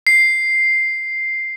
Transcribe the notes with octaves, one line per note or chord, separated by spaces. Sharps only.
C7